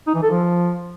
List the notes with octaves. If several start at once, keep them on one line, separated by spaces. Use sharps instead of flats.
D#4
E3
A4
F3